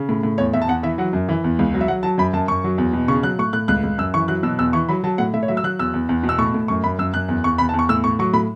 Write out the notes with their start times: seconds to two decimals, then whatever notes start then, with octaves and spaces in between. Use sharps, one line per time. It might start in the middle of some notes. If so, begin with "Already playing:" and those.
Already playing: C#3
0.09 A2
0.23 A2
0.38 E2 C#5
0.53 E2 E5
0.62 A5
0.68 E2 F#5
0.83 E3 E5
0.98 F#3 F#5
1.13 F#2
1.29 E3
1.44 E2
1.59 C#2
1.74 F#3
1.81 E5
1.88 F#3 F#5
2.03 F#3 A5
2.18 F#2 B5
2.33 F#2 A5
2.48 F#2 C#6
2.64 F#3
2.78 E2
2.93 B2
3.08 C#3 C#6
3.23 F#3 F#6
3.39 A2 C#6
3.53 A2 F#6
3.68 C#2 F#6
3.83 C#2
3.98 F#2 E6
4.14 E3 C#6
4.28 F#3 F#6
4.43 B2 E6
4.59 E2 E6
4.73 E3 C#6
4.89 F#3 B5
5.04 F#3 A5
5.18 A2 F#5
5.34 A2 E5
5.43 C#5
5.48 F#3 E5
5.57 E6
5.63 F#3 F#6
5.79 E2 E6
5.94 E2
6.09 E2
6.23 B2
6.29 E6
6.38 A2 C#6
6.54 A2
6.68 F#2 C#6
6.84 F#2 B5
6.99 F#2 E6
7.14 F#2 F#6
7.28 E2
7.44 E2 C#6
7.58 E2 B5
7.69 A5
7.74 E2
7.79 C#6
7.89 A2 E6
8.04 A2 C#6
8.19 F#3 C#6
8.33 A2 B5